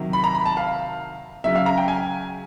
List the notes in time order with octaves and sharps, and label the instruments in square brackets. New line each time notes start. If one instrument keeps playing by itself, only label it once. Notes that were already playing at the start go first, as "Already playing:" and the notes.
Already playing: [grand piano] C3 D#3 F#3
B5
A#5
B5
A5
F5
C#3 F#3 E5
F5
A#5
G5
G#5